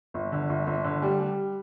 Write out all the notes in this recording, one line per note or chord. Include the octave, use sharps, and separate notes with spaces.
G1
D3
G1
G1
D3
G3
G3